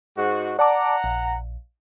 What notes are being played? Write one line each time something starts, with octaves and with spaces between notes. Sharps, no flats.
G#2 F#4
D5 F#5 A5 A#5 D6
A#1